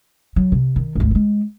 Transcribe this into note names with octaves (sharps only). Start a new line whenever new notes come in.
F#3
C3
D#3
G#1 D2
F#3 G#3